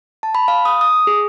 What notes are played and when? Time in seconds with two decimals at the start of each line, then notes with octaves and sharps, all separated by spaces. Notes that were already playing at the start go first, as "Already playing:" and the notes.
0.23 A5
0.35 B5
0.48 F5
0.65 D#6
0.81 D#6
1.07 G#4